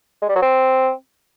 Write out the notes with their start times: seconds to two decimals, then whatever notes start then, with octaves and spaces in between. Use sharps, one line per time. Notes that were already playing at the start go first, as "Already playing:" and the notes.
0.22 G#3
0.29 G3
0.35 F#3
0.42 C4